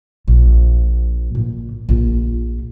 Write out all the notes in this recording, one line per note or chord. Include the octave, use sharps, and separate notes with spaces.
A#1
A#2
A#1 F4